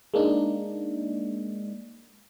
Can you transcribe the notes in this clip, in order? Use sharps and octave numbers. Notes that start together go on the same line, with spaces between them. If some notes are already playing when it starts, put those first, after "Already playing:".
G#3 A#3 D4 D#4